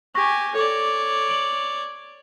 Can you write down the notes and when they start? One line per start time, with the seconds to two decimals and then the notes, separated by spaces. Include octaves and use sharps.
0.15 G4 G#5 C#6 A#6
0.55 A4 C#5 D5
1.29 D7 F#7